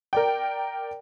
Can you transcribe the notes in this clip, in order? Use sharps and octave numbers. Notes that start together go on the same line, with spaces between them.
A#4 D5 G5